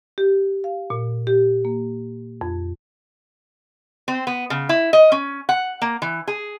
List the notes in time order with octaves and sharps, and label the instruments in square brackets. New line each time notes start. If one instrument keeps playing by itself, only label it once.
[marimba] G4
F5
A#2
G4
A#3
F2
[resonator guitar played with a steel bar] C4
B3
C#3
E4
D#5
C#4
F#5
A#3
E3
G#4